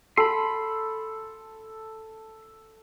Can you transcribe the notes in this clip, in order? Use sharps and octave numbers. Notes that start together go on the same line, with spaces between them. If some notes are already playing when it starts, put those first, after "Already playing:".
A4 B5 C6